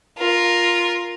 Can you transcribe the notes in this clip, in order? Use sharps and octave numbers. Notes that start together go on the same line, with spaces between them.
F4 A#4